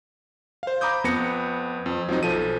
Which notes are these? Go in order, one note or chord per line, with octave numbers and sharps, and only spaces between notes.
C5 F5
A#5 B5 D6 D#6 G6
F2 B3 A#6 C#7
F2
F3 F#3 C4 D#4
B1 F3 A4 D#7